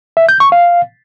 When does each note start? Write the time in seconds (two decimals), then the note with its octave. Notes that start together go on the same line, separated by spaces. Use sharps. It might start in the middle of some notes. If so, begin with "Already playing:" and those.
0.17 E5
0.29 G6
0.40 C#6
0.52 F5